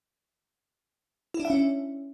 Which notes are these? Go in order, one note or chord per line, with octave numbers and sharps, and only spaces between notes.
E4
D4
E5
C#4